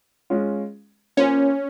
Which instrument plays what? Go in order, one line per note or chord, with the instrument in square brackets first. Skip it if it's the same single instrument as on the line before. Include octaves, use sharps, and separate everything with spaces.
[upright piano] G#3 C#4 F4
[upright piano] A#3 F4 C5 [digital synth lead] C#4